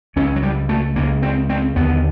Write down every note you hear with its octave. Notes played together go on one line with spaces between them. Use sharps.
C#2 C#3 C#4
F#3
G3
A3
C#2 C#3 A#3
C4
C4
D#2 D3 B3